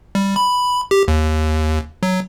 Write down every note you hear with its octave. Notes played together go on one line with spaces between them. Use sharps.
G3
B5
G4
D#2
F#3